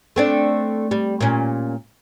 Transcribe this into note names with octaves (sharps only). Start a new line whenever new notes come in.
A3 C4 D4
G3
A#2 C#4